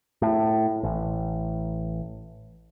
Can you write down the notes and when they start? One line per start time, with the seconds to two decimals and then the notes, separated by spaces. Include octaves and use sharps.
0.22 A2
0.83 A1